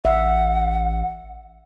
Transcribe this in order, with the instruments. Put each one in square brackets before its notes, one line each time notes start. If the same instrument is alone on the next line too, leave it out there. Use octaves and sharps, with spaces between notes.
[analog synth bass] A1 [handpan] E5 [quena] F#5